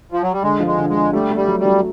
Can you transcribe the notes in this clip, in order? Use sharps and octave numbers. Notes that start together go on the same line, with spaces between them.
F3
F#3
G3
D3 G#3
F3
G#3
D3
G#3
D3
G3 A3
A3
G3
F#3
G3
F#3